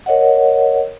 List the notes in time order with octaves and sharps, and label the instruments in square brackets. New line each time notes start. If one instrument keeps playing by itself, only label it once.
[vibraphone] A#4 C#5 D#5 F#5